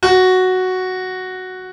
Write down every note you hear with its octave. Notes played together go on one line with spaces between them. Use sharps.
F#4